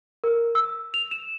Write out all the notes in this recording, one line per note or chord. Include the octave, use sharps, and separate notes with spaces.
A#4
E6
F7
E7